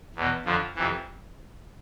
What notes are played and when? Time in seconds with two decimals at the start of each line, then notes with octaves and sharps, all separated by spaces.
0.16 E2 B2
0.45 F2 D3 F3
0.76 F2 C3 E3